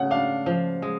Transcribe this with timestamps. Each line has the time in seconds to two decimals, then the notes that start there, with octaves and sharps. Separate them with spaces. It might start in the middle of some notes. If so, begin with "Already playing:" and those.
Already playing: C#3 A3 F#5
0.11 D4 F5
0.46 F3
0.82 G#3